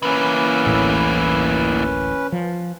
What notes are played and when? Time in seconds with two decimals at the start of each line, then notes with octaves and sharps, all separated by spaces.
0.02 E3 A#3 C#4 B4
0.66 D1 A1 A2
2.32 F3